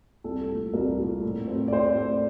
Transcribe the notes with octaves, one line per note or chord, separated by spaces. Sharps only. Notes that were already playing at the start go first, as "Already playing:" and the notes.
C2 A4
A#2 A3
C2 A#4
A#2 A3
A2
A3 C4
D5
A2 C5
A3 C4 D5